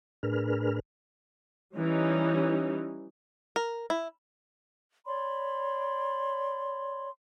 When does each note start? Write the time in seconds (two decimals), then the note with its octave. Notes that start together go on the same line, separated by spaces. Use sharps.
0.23 A2 D4 G#4 A#4 B4 F6
1.76 E3 G3 C#4 D#4
3.56 A#4
3.90 E4
5.06 C#5 D5 B5 C6